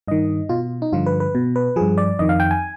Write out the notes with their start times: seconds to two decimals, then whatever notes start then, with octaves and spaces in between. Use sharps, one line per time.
0.08 G2 D#3 D#5
0.49 B2 F4
0.82 D#4
0.92 G2 D3 F3 F4
1.06 B4
1.20 B4
1.35 B2
1.56 B4
1.76 G2 F3 G#4
1.98 D5
2.19 F2 D#3 D#5
2.29 F5
2.40 G5
2.51 G#5